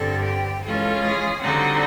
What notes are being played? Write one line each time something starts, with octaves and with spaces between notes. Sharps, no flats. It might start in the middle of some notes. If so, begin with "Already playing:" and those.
Already playing: G2 D3 G3 C4 A4
G4
E3 G#3 C#4 F4 A4
G#4
D3 G3 C4 D#4 F#4